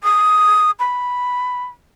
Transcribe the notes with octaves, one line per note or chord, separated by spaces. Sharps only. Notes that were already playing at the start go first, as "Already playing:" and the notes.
D#6
B5